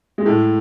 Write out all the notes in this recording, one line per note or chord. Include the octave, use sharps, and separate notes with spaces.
G#3
A2 A3